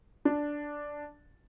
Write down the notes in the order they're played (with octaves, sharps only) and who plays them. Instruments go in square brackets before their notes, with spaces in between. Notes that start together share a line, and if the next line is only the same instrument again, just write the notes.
[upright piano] D4